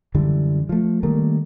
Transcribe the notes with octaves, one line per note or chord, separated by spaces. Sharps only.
F#2 D3 E3 G3
F3 A3
D#3 G3 A3 A#3